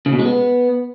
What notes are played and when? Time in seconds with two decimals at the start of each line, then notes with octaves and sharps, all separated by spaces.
0.06 C#3
0.12 B2
0.19 G#3
0.25 B3